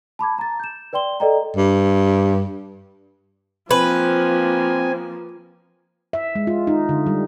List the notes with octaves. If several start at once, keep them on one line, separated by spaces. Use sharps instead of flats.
A5 B5 D6 G#6
A#5 A6
G6 E7
B4 D5 G5 C6 G7
A4 B4 D5 D#5 G5 A#5
G2
F3 A#3 C4 B4 G#5
E5
G#3
F4
D#4
D3
G3